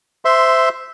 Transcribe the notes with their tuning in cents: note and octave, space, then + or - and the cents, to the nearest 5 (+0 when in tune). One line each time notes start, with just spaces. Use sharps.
C5 -15 E5 +0 C6 +0